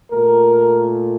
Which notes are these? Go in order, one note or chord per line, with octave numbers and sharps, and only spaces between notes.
A#2 A3 A#4